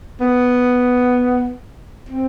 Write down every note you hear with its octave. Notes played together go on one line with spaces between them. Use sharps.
B3
C4